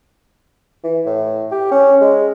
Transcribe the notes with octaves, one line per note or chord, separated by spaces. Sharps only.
E3
A2
G4
C#4
G#3